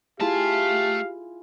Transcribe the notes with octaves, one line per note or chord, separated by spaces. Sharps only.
A3 E4 F4 G4 G#4 F5 A5